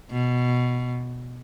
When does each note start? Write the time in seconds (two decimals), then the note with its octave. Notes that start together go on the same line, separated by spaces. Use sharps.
0.10 B2